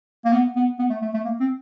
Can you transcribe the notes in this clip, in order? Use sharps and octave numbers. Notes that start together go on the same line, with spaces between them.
A#3
B3
B3
B3
A3
A3
A3
A#3
C4